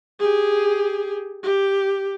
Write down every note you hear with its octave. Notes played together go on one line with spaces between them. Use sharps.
G4 G#4
G4